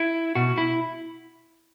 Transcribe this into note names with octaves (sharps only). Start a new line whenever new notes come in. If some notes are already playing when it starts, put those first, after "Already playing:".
Already playing: E4
B2 F#4
E4